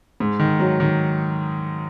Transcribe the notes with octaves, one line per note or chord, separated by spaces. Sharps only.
G#2
D#3
F#3
D#3